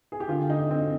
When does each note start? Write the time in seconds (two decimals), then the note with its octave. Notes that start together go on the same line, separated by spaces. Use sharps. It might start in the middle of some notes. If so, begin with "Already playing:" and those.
0.12 G#4
0.20 G4
0.29 D3 F4
0.50 D#4
0.71 C4